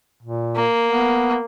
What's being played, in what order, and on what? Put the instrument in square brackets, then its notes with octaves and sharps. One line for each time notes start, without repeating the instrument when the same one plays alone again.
[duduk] A#2
[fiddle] A#3
[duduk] B3